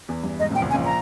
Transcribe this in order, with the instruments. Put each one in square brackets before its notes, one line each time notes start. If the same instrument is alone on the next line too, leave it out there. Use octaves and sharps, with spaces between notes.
[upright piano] E2 E3
G2
[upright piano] G#2 [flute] D#5
[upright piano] A#1 A#2
[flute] G5
[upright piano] C#2 C#3
[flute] G#5
[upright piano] A#1 A#2
[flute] A#5